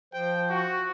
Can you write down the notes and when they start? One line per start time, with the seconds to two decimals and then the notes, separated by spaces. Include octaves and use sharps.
0.14 F3 C5 G5
0.50 F#4